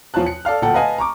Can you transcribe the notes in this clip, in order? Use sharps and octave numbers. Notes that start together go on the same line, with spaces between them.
E2 F3 F4 C#5 A5 F#6
C#7
A4 D5 F5 F6
D1 A#2 A4 F#5 G5
B4 D#5 F5 G#5 A5
A#5 C#6 D6